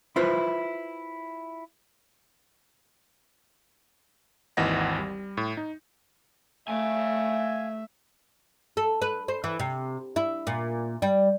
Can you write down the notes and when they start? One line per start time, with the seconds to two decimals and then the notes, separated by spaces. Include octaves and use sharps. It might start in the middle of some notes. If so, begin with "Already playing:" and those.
0.16 E4 F4 B4 C5
4.57 G#1 D#2 E3 D#5 F#5 A#6
4.98 G3
5.37 A2
5.57 D#4
6.68 A3 E5 F5 G#5
8.77 A4
9.02 B4
9.28 C5
9.44 E3
9.59 C3
10.16 E4
10.47 A#2
11.02 G3